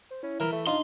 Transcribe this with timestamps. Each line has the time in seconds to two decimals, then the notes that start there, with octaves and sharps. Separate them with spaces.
0.11 C5
0.23 C#4 E4
0.40 E3 A#4
0.52 A3
0.67 D4 D#4 F4 C6